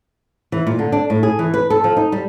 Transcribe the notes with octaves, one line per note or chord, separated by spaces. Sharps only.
E3
A#2
D3
D4
A2
G#4
E3
B4
A4
F3
D#4
G3